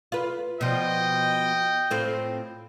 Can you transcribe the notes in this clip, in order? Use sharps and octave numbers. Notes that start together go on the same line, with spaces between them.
F4 B4
B2 F3 D#5 G5
A2 C4 F4